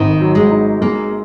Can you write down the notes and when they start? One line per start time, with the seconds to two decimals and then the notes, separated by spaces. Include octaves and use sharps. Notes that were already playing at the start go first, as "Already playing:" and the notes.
Already playing: G#1 D#3 D#4
0.20 F#3
0.35 G#3
0.51 D#4
0.81 G#3 A#3